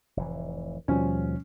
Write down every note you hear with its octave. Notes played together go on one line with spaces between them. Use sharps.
F1 A2 E3
D#2 B2 F3 G3 C#4